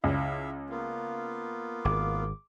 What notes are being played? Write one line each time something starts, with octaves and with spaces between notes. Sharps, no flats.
C#2 E4 E5 F5
A#3 B3 F4
G#1 D6